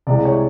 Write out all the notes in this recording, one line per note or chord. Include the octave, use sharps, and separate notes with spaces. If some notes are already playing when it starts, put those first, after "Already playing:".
C2 C3 E3 G#3 D5
C#5